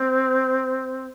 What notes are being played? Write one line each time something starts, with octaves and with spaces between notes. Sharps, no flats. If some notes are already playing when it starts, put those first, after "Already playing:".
Already playing: C4